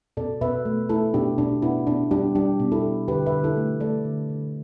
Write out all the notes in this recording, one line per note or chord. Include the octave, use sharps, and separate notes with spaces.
B2 A4 D5
B2 B4 E5
A3
A3 E4 A4
B2 D4 G4
B2 D4
B2 B3 E4
B2 D4
G3 D4 G4
G3 D4 G4
B2
E4 A4
B2
D3 G4 B4
B4 E5
D3
E4 A4
A3
A3 A4 D5
D3
D3